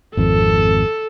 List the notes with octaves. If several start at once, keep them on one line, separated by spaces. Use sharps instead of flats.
G#1 F2 A4